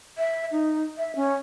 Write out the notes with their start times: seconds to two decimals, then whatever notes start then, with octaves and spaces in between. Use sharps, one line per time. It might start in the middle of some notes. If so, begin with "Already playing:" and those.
0.18 E5
0.52 D#4
0.98 E5
1.16 C#4